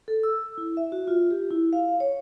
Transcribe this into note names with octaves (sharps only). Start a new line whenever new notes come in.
A4
E6
E4
E5
F#4
F4
G4
E4
F5
C#5